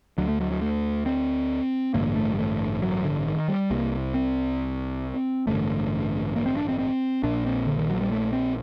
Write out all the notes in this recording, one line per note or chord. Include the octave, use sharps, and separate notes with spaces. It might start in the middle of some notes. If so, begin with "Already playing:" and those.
D2 D3 F#3
A3
F#3
F#3
A3
C4
A1 G2 D3 A#3
A3
G3
A3
F#3
D3
D#3
G3
C2 C3 A#3
C4
A1 G2 D3 A3
A#3
C4
D4
C4
C4
A#1 A#2 D4
C4
D3
D#3
F#3
G3
A3
C4